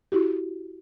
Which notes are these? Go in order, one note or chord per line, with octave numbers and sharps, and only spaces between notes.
E4 F#4 G4